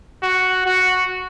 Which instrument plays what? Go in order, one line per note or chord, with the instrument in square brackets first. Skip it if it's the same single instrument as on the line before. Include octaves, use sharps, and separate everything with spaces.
[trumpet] F#4
F#4